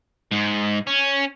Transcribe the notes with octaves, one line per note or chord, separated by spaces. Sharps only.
G#2
C#4